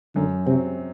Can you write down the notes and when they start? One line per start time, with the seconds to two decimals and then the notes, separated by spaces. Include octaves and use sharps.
0.15 F#2 D3
0.46 C3 F#3 C4